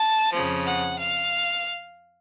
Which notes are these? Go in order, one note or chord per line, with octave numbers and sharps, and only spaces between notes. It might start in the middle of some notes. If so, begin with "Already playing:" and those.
Already playing: A5
F2 C#3 F3
F#5
F5